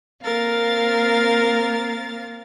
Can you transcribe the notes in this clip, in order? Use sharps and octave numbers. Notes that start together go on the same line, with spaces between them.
A#3 C4 A#4 F5 A6